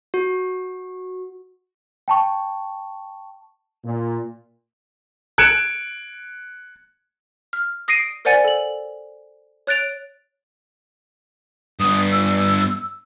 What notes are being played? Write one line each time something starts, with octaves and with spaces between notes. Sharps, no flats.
F#4
G5 A5 C#6
A#2
F#6 G#6 C#7 D7 E7
F6
D#6 A#6 C7 D7 D#7
A#4 C5 D5 F#5 G#5 A6
A4 F#7
C#5 F#6 A6 D7 F7
G2 B3 D#6
E6